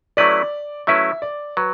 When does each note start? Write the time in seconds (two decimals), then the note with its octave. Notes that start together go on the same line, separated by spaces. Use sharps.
0.17 F#3 A3 C#4 E4 B4 D5
0.87 F#3 A3 C#4 E4 B4 E5
1.22 D5
1.57 F#3 B4